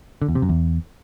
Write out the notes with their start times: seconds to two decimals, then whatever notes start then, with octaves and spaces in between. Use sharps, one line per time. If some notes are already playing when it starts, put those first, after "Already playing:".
0.22 D3
0.28 E2
0.35 C3
0.42 F#2
0.49 E2